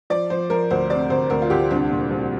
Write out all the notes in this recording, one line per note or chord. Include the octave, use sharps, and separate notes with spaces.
F3 D5
F3 C5
F3 A#4
D2 C5
C3 D5
D2 C5
D2 A#4
F4
D2 G4
C2 D4
A#2
C2